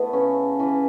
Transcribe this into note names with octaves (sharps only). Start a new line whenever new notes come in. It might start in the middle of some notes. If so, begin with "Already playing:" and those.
Already playing: E3 A3 B3
C#3 C#4
E3 C#4